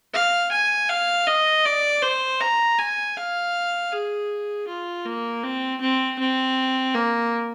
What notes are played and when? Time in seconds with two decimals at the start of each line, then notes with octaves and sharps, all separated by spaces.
0.13 F5
0.52 G#5
0.89 F5
1.27 D#5
1.65 D5
2.02 C5
2.41 A#5
2.79 G#5
3.16 F5
3.92 G#4
4.68 F4
5.05 A#3
5.43 C4
5.81 C4
6.19 C4
6.94 A#3